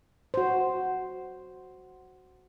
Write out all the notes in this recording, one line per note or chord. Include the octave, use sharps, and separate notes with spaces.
F#4 C5